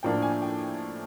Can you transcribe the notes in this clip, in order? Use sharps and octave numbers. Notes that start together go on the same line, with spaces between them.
A2 F3 A#3 D4 G5
G#5
G5